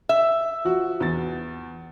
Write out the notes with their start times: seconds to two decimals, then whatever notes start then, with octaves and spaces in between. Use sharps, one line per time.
0.09 E5
0.65 F3 F#4
1.00 E2 A6